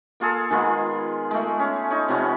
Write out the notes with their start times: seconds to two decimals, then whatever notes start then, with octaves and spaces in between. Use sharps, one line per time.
0.20 A#3 F4 G#4 A4
0.50 D#3 G#3 B3 F4
1.31 G#3 A3
1.59 C#4
1.90 D#4 C#5
2.08 C3 F3 B3 C#4